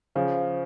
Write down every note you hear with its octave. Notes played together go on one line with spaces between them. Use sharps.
C#3 F3